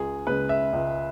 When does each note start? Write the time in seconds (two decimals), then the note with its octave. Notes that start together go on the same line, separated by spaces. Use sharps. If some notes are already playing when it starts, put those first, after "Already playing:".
Already playing: C#2 G#4
0.27 C#3 G#3 B4
0.49 E5
0.73 C#2